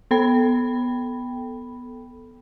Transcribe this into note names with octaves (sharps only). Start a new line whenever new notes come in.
B3 A4 G5 B5